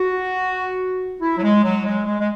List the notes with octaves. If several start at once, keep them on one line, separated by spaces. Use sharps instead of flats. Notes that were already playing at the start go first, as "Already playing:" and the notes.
Already playing: F#4
E4
F#3
G#3
F#3
G#3
G#3
G#3